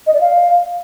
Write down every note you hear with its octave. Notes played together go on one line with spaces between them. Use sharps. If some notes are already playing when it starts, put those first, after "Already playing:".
D#5
D5
F5